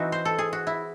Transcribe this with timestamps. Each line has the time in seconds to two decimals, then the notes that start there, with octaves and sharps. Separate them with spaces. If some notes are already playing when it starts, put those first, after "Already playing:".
Already playing: E3 C4 D#4 F#4
0.12 C5
0.25 A4
0.38 G#4
0.53 F#4
0.67 E4